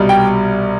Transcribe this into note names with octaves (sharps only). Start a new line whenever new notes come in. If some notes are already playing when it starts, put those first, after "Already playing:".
Already playing: C2 B2 G3
G5